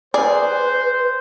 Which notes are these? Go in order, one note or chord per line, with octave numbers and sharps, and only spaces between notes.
G#4 B4 C5 D5